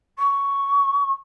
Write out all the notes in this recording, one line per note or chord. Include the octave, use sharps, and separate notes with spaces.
C#6